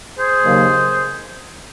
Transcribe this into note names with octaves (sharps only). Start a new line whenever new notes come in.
G#4 C5
D#2 C#3 F#3 A#3